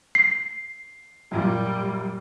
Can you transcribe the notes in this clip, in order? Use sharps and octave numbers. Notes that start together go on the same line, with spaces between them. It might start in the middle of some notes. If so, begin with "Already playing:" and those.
C7
F#2 A#2 G3 F4